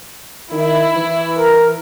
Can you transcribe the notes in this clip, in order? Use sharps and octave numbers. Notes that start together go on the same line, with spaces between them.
D#3 E4
E3
A#4